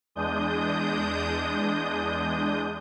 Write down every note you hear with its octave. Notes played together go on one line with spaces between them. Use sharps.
E2 G#3 D4 D#6 G6